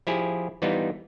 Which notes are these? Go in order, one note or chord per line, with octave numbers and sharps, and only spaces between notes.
F3 E4 G4 G#4
E3 G3 B3 D#4 F4